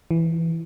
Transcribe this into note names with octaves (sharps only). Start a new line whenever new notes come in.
E3